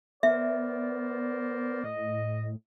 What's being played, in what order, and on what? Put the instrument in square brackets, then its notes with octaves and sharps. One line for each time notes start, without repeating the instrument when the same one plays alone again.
[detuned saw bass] B3 [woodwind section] A#4 C5 D5 [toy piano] E5
[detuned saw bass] A2 [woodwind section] D#5